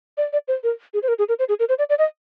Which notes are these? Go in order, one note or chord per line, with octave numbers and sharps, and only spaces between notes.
D5
D5
C5
A#4
G#4
C5
A#4
G#4
A#4
C5
G#4
A#4
C5
D5
D5
D#5